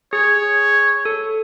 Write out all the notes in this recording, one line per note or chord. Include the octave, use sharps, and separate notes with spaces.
G#4 C#5
A4